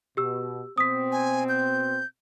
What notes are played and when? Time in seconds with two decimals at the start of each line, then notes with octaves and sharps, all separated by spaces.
0.17 B2 G4 E6
0.78 B2 C4 D#6 B6
1.12 G#5
1.49 G6